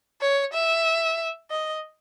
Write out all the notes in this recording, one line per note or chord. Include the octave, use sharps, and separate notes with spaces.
C#5
E5
D#5